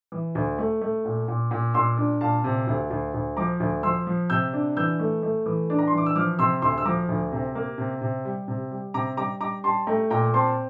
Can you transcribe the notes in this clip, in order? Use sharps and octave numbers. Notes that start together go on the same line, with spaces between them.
E3
D2
A3
A3
A#2
A#2
A#2
A#2 C6 E6
D4
A#2 F5 A5
C3
D2
D2
D2
F3 A#5 D6
D2
F3 C6 E6
F3
C3 E6 G6
D4
E3 E6 G6
A3
A3
E3
D4
A#5
C6
E3
D6
E6
F3 D6 F6
C3 C6 E6
D2 C6 E6
E6
F3 A#5 D6
D2
C3
A#3
C3
C3
G3
C3
G3
C3 A#5 D6
G3 A#5 D6
G3 A#5 D6
G3 A5 C6
A3 G5 A#5
A#2 G5 A#5
C4 A5 C6